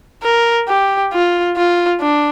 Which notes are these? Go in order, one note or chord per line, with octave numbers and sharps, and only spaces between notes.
A#4
G4
F4
F4
D4